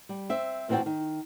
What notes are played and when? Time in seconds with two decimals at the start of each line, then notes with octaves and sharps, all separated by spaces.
0.09 G3
0.29 C4 E5
0.69 A#2 E3 C4 F#4 G5 A5
0.86 D#3